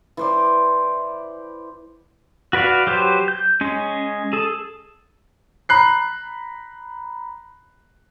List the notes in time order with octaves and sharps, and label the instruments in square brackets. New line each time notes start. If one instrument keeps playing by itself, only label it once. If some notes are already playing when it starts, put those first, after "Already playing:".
[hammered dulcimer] E3 C5 D5
[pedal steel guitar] F#4 B4 D5 F5
F#3 G4 B4 C5
G6
G#3 C#4
G#4 A4
[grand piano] A#5 B5 F#6 C7